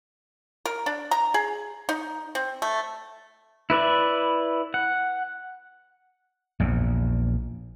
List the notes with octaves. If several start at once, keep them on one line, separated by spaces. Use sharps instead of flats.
A#4
D4
A#5
G#4
D#4
C4
A3
E4 B4 D5 E5
F#5
A#1 E2